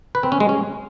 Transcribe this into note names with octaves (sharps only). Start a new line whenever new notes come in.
B4
C4
C#4
G#3
C#4